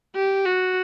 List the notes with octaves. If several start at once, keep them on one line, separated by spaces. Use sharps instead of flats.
G4
F#4